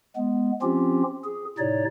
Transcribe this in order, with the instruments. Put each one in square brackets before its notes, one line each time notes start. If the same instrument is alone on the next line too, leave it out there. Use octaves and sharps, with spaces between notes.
[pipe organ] G#3 B3
F3 C4 C#4 F4 G4
G#4
A2 C3 D#4 C#5 D5